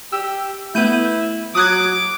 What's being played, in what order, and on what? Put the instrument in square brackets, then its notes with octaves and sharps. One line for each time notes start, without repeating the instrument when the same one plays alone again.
[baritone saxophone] G4 [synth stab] E6
[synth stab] A3 B3 [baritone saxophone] E4 [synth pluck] G6 D#7
[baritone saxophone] F#3 [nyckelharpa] D6 [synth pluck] D#6 F#6 G#6